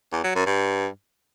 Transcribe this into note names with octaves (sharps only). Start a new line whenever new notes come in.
E2
F#3
F#2
G2